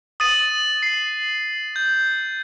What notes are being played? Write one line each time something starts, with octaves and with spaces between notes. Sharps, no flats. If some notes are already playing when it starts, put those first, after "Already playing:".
D#6 A6 D#7
C7
G6